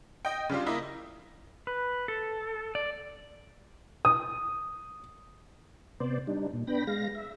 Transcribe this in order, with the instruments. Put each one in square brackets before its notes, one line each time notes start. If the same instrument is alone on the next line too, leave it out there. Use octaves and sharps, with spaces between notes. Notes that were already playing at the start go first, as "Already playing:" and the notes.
[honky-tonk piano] D#5 G5
C#3 G3 D4 F4
A#3 E4 D#5
[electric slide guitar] B4
A4
D5
[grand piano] D#6
[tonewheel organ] C3 B3 C5 D5
G3 D4 D#4
A#2
B3 D4 G5 B5 A#6
G#3 F5 A#6
E5